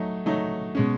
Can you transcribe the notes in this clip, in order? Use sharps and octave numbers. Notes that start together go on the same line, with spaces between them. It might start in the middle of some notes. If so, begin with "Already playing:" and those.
Already playing: F#3 A3 D#4
F#3 A3 D#4
B2 G#3 C#4